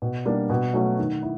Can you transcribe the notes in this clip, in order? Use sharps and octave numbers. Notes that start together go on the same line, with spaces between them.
B2
G3 A#3 D4
B2
F#3 A3 C#4
D#3
E4